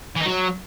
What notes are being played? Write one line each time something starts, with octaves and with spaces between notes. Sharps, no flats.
E3
D#4
F#3